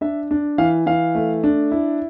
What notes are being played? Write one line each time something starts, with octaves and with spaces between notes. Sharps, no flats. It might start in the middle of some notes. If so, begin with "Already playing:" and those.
D4 E5
D4
E3 F5
E3 F5
A3
D4
E4